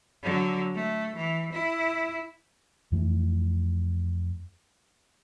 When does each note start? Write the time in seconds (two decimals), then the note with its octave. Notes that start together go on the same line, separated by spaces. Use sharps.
0.23 D3 F#3
0.75 A3
1.16 E3
1.53 E4
2.92 F2 E3 A3